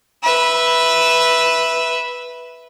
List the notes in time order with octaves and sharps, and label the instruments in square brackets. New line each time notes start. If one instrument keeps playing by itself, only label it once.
[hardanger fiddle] B4 E5